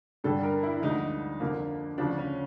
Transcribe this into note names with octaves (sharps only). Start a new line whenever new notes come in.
G2 D3 G3 A4
A#4
E4
D2 D3 F3 G#3 D#4
F2 D3 F3 A#3
D2 C#3 F3 D4
C#4